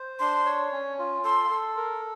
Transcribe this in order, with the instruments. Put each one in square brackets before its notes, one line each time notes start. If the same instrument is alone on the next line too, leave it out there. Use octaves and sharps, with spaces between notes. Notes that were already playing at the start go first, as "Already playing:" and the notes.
Already playing: [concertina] C5
[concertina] D4 [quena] C6
[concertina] C#5
C#4
F4
[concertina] A4 [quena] C6
[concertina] A4
A#4